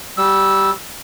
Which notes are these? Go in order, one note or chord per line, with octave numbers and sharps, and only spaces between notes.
G3 E6